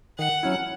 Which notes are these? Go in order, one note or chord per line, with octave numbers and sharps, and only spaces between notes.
D#3 F#5
F#3 C#4 E4